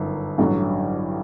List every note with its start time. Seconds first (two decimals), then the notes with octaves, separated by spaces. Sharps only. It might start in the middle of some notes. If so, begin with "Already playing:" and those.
Already playing: G1 F#2 D#3
0.38 A1 G2 D3 F#3